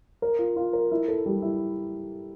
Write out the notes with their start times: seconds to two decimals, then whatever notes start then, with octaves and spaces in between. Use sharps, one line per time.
0.22 A#4
0.39 F4
0.56 F4
0.73 A#4
0.92 E4
1.08 A4
1.26 G3
1.42 E4